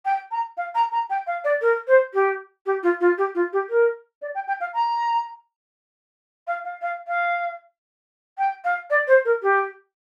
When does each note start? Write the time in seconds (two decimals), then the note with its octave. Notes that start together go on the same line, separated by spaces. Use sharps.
0.05 G5
0.31 A#5
0.57 F5
0.75 A#5
0.92 A#5
1.10 G5
1.27 F5
1.44 D5
1.61 A#4
1.87 C5
2.14 G4
2.66 G4
2.83 F4
3.00 F4
3.18 G4
3.35 F4
3.53 G4
3.69 A#4
4.22 D5
4.35 G5
4.48 G5
4.60 F5
4.74 A#5
6.47 F5
6.65 F5
6.82 F5
7.08 F5
8.38 G5
8.64 F5
8.90 D5
9.07 C5
9.25 A#4
9.42 G4